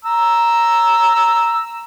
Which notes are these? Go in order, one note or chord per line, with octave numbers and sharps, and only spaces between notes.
A#5 E6